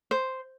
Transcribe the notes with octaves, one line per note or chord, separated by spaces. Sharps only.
C5